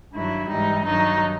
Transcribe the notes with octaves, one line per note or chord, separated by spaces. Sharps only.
G2 D#3 F#3 E4
G#2 E3 G3 D#4
G2 D#3 F#3 D#4